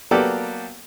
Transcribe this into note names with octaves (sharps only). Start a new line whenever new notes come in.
F#3 A#3 B3 G4 A4 D5